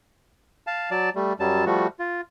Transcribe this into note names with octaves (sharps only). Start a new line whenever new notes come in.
F5 A5
F#3 D5 A5
G3 A3
F#2 F#3 G3 A5
F3 G3 A3 F#4
F4